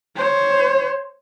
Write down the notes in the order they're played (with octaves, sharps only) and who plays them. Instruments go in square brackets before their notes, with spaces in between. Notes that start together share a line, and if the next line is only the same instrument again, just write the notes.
[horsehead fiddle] C5 C#5